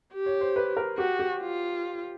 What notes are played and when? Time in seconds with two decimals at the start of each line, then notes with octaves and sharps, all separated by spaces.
0.13 G4
0.26 C#5
0.41 C5
0.56 B4
0.77 A#4
0.98 F#4 G4
1.19 G4
1.42 F4